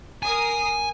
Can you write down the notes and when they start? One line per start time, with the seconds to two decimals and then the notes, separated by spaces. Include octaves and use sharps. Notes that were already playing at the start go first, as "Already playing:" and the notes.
0.23 A#4 G#5 D#6 C7